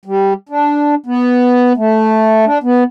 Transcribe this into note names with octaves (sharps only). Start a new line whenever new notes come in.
G3
D4
B3
A3
D4
B3